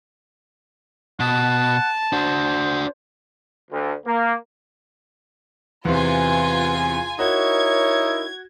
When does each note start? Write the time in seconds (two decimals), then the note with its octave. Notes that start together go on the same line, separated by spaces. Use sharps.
1.20 B2 F#5 A5
2.13 D4 F#4 C5
3.72 D2
4.07 A#3
5.85 E2 C3 F4 B4 G#5
7.19 D#4 E4 F#4 A#4 C#5 G#6